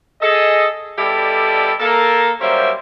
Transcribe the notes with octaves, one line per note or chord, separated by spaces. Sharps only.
G#4 A4 D#5
B2 G3 E4 G4 A4 D5
A#3 A4 A#4
F#3 G3 A#3 C#4 C5 E5